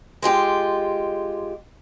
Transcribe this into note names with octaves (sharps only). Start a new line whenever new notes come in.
G#3 F4 G4